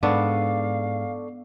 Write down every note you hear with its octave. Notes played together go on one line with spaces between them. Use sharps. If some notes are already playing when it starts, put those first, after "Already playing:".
G#2 B3 D4 A4 D5 F5 C#6